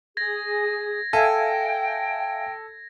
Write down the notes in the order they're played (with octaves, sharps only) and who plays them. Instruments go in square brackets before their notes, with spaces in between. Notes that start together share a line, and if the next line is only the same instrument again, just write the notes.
[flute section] G#4 [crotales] G#6 A#6
[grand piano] A4 [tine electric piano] E5 F5 G#5 [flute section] G5